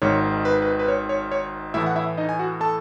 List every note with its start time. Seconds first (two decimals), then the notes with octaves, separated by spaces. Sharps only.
0.02 G#1 G#2 D#3 C#5
0.45 B4
0.62 B4
0.79 B4
0.88 C#5
1.09 C#5
1.32 C#5
1.74 A2 E3 A3 E4 E5
1.86 F#5
1.96 E4 E5
2.17 D#4 D#5
2.29 G#5
2.39 F#4 F#5
2.60 A4 A5